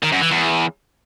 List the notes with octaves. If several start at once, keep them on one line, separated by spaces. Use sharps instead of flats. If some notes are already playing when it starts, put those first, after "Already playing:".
D#3
F#2
E3
E2